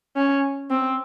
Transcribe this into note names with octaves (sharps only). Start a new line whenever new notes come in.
C#4
C4